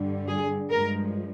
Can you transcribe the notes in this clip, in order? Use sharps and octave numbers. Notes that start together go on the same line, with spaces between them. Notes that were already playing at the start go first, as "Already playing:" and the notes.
Already playing: G2 D3 G3
G#4
G2 F3 G#3 A#4